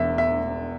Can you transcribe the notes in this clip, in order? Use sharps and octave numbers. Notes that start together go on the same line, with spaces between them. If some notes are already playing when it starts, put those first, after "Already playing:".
Already playing: E1 E2 E5
E5